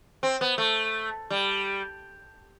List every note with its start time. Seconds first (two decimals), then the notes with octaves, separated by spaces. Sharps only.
0.23 C4
0.41 B3
0.58 A3
1.30 G3